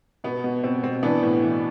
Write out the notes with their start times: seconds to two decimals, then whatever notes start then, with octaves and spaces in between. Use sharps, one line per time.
0.24 B2 B3
0.44 B2
0.64 B2 C4
0.83 B2 C4
1.03 E3 B3 D4
1.23 A2
1.43 E3